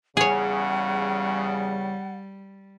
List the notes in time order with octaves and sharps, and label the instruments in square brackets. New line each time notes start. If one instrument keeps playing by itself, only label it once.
[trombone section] E2 C#3 [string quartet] G3 [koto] G#4 C#5 [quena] F#5